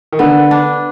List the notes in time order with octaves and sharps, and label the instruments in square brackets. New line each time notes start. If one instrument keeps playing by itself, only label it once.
[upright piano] D#3
[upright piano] D3 [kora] B3
[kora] D4